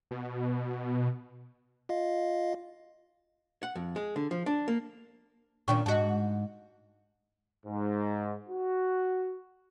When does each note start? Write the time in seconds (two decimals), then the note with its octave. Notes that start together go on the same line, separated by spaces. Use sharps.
0.11 B2
1.89 F4 D#5 F5
3.63 F#5
3.76 F2
3.96 G#3
4.16 D3
4.31 F3
4.46 D4
4.68 A#3
5.68 A#2 D#3 C#4 D4 G5 C#6
5.86 G#2 F#4 D#5 A5
7.66 G#2
8.49 F#4